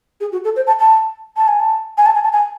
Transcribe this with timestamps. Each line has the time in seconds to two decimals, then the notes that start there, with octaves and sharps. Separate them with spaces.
0.21 G#4
0.32 F#4
0.44 A4
0.56 C5
0.67 A5
0.80 A5
1.37 A5
1.48 G#5
1.60 A5
1.98 G#5
2.06 A5
2.15 G#5
2.24 A5
2.32 G#5